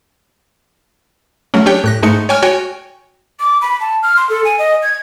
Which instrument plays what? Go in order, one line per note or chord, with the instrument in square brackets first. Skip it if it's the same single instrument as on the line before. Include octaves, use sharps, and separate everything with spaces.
[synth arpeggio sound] F#3 A3 C#4
D4 G4 C#5 G5
A2 F#6 A#6
G#2 G#3 A3 D#4 C#7
C#5 G5 G#5 C#6 F6
F#4 C#5 G5 G#5
[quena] D6
B5
A5
F6
C6
A4
G#5
D#5
G#6